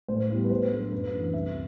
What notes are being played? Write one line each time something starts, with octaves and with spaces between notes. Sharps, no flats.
A2 C5
G3 B3 E4
B4
A2 C5
F#3 A3 D4
F#2 B4
E3 A3 D4
C2 E5